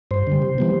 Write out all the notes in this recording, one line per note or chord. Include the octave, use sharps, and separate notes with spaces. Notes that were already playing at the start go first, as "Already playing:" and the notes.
G2 C5
D3 G3
C3
E3 G3 B3